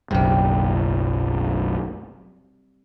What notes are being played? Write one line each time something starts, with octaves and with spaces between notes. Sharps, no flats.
F#1 B1 F#2 C3 G3